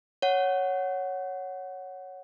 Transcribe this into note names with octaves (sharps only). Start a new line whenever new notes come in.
C#5 F#5